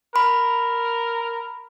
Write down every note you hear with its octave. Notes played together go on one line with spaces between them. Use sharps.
A#4 B5